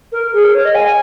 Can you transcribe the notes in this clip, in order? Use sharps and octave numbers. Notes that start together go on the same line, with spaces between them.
A#4
G#4
A#4
C#5
D#5
G#5